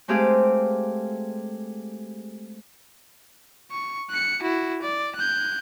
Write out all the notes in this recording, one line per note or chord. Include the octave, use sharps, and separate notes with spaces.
G#3 A3 C4 G4 G#4 F5
C#6
F#6 C#7
E4 F#4
D5
F#6 G6